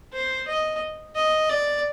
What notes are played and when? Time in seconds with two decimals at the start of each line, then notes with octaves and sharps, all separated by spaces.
0.13 C5
0.47 D#5
1.15 D#5
1.49 D5